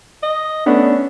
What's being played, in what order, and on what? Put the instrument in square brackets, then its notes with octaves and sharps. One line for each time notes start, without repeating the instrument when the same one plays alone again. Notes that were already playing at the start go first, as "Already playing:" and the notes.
[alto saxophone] D#5
[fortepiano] A3 B3 D4 [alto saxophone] C#4